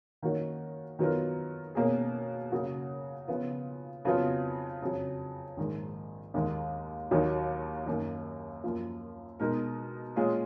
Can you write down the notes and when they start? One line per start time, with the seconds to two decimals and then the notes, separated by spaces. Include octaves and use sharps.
0.23 D#3 A#3 C#4 F#4
0.99 D#3 F#3 B3 F4 A#4
1.75 B2 A#3 C#4 G#4
2.52 C#3 F#3 A#3 C#4 F#4
3.28 C#3 F3 B3 F4
4.05 F2 C#3 F#3 B3 F4
4.82 F2 C#3 F#3
5.57 A#1 G#2 D#3 G#3
6.34 D#2 D#3 G#3
7.11 D#2 D#3 F#3
7.87 F#2 D#3 A#3
8.64 F#2 F3 A#3
9.40 B2 G#3 D#4 A#4
10.16 A#2 G#3 C#4 F4 G#4